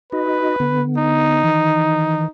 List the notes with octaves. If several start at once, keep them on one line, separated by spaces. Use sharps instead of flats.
D#4 F#4 B4 D#5
D3 B3
D#4
D#3 E3